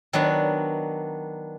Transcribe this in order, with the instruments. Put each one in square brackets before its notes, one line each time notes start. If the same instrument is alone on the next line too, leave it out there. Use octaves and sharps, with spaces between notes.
[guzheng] D#3 F#3 B3 D4